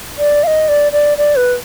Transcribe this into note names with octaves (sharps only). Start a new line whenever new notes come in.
D5
F5
D#5
D5
D5
D5
B4